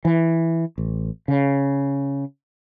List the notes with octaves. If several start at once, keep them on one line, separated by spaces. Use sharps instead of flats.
E3
A1
C#3